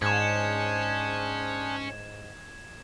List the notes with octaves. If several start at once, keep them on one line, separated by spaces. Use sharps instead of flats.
G#2 C#4 D4 G#4 C5 G#6 E7